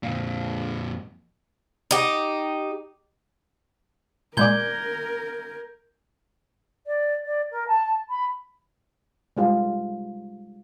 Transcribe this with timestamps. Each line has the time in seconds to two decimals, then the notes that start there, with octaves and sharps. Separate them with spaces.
0.03 F2 A#2
1.91 D#4 G4
4.37 A#2 G#3 A#4 D5 G6 G#6 G7
6.87 D5
7.26 D5
7.51 A#4
7.68 A5
8.09 B5
9.37 G3 G#3 F4